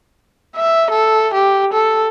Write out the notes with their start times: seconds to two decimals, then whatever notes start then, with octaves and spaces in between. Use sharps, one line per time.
0.57 E5
0.91 A4
1.33 G4
1.73 A4